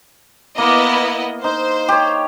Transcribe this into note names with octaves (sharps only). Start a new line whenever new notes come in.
A#3 B3 E4 D#5
D#4 C5
G4 C#5